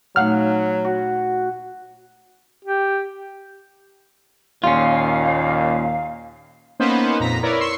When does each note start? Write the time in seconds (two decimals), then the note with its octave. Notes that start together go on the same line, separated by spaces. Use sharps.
0.16 A#2 F#3 A3 D#4 F5 F#5 F6
0.85 F#4
2.65 G4
4.64 D#2 A#2 C#4 F4 F5
6.80 A#3 B3 C#4 D#4 B4 C5
7.20 F2 A#2 A#5 A#6 B6
7.42 E4 A#4 B4 C#5 D5
7.60 C6 C#6 E6 C7 C#7